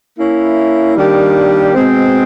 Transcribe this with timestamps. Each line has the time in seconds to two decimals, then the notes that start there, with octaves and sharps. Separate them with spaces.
0.18 A#3 C#4 E4
0.96 D#3 G3 A#3 D4 G4
1.74 B2 G#3 C4